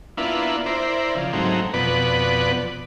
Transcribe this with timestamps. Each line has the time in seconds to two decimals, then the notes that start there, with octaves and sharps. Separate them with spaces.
0.17 A#3 B3 D4 E4 F4
0.66 E4 A#4 C5 D5
1.15 C#3 F3
1.33 G#2 F#3 A3 A#3 C4 D#4
1.74 F2 B2 B3 B4 D5